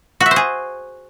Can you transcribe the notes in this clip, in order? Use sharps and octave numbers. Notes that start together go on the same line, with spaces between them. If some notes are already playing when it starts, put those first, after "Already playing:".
F#4
E5
C5
G#4